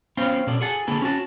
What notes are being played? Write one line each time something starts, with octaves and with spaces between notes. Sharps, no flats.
B3 C#4 C5 F5 G5
B2 C#4 A4 D5
G#4 A4 F#5 G#5 A5
D3 A#3 G#4 A4 B4 A5
C#4 F#4 A5